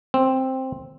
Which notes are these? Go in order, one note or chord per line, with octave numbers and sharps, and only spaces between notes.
C4